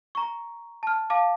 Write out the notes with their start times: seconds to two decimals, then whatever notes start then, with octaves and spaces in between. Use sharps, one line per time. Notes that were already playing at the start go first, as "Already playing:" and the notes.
0.15 A#5 C#6
0.83 A5 F6
1.10 F5 A5 D6